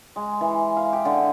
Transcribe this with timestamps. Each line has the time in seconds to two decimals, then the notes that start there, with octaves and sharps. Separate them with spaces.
0.16 G#3
0.41 E3
0.77 F5
0.93 G4
1.05 D3